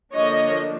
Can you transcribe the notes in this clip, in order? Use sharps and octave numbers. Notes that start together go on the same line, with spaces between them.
D3 F3 A#3 D4 C#5 D#5